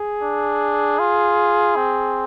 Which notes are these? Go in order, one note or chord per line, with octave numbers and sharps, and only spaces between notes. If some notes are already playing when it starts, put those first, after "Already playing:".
Already playing: G#4
D4
F4
C4